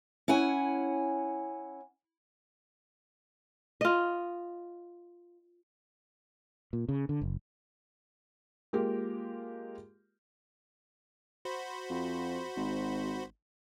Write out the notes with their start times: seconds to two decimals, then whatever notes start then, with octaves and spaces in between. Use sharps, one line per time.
0.28 C#4 E4 F#5 G#5
3.81 F4 D#5
6.73 A#2
6.89 C#3
7.09 D3
7.22 F#1
8.73 G#3 A#3 F4 G4 A#4
11.45 F#4 C5 B5
11.90 F2
12.57 G#1